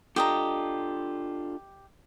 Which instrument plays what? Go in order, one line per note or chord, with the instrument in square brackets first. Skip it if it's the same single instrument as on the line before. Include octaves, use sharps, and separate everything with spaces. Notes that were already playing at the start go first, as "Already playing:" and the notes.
[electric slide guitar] D4 F4 A4 [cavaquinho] G4 D#5 A#5